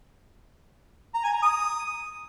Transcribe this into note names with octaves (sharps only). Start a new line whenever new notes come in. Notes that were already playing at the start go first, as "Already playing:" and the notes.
A#5
G#5
A#5
D#6